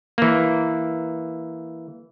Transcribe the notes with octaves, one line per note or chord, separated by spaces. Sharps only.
E3 A#3